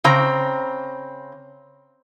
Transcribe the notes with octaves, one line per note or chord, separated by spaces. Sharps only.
C#3 C4 A#5